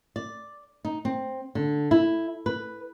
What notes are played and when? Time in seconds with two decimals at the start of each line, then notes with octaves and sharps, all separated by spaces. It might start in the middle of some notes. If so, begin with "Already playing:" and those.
0.16 D5
0.85 D#4
1.05 C4
1.55 D3
1.91 E4
2.46 B4